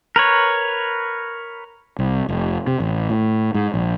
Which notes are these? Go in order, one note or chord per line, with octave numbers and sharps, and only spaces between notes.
A#4 B4 C#5
C2
F1
C3
A1
A2
G#2
A#1